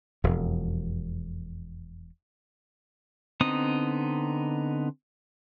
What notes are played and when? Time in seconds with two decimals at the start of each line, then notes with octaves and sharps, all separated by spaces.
0.24 E1 F2
3.41 D3 B3 C4 D#4 D#6